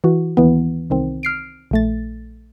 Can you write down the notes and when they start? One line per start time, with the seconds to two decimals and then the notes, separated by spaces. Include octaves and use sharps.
0.04 E3 F#4
0.37 D#2 E3 B3
0.90 C2 D#3 C4
1.23 F6 C7 D7
1.71 A#1 A3 A6